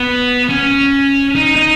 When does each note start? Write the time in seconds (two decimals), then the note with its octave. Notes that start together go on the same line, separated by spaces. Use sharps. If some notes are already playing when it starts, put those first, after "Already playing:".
Already playing: B3
0.49 C#4
1.35 D#4
1.56 D#4